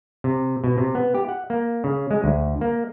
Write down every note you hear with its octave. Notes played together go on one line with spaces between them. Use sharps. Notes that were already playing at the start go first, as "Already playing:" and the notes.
C3
B2
C3
B3
G4
F#5
A#3
C#3
G#3
D2
A#3